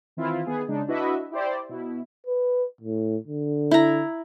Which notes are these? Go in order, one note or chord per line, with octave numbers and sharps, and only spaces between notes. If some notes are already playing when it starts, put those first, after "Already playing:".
D#3 E3 C4 E4 F4
D#3 B3 G#4
C#3 G#3 D4 D#4
D4 E4 F#4 B4 D#5 E5
E4 G4 C5 D5
B2 E4
B4
A2
D3
E4 A#5